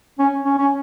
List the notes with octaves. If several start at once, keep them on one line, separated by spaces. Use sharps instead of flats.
C#4
C#4
C#4